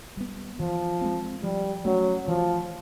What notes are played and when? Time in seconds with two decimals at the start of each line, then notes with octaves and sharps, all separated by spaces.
0.17 G3 B3
0.59 E3 F3
1.01 G#3 C4
1.43 F3 G3
1.85 F#3 A3 C#4
2.28 E3 F3